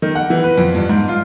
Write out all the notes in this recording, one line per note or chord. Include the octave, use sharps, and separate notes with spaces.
D#3
F#5
E3
B4
F2
G2
G#2
F4